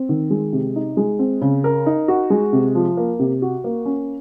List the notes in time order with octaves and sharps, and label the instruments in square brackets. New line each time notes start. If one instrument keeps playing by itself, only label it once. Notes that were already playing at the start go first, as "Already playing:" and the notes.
Already playing: [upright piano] C4
D#3
G#3
C3
D#4
G#3
C4
C#3
A#4
D#4
F#4
G#3
C3
F3
A#3
C3
F#4
A#3
C#4